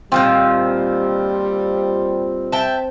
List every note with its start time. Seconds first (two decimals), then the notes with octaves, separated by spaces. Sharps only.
0.12 A#2 D#3 F3 G3 C4
2.52 E5 G5 A5